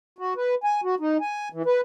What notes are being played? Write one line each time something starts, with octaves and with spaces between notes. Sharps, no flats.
F#4
B4
G#5
F#4
D#4
G#5
E3
B4